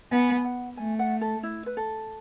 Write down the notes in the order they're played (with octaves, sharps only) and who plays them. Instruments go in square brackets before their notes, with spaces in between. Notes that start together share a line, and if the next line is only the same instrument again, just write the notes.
[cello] B3 [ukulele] G#5
[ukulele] G#5
F#5
[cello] A3 [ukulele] G#5
[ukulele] F#5
A4
E4
B4
A4